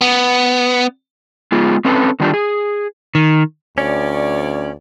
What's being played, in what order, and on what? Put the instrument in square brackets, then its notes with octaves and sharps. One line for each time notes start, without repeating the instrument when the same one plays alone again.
[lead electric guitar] B3
[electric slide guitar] G#3 B3 F4 G#4
C4 C#4 A4 B4
D3 D#3 G3 D4 F4 G4
G#4
D#3
[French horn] D2 [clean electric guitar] C#4 [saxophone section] C#5 D5